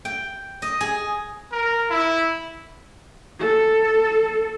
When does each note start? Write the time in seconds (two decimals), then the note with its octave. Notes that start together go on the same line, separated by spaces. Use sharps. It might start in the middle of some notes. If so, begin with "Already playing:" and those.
0.05 G5
0.62 D#5
0.81 G#4
1.52 A#4
1.90 E4
3.39 A4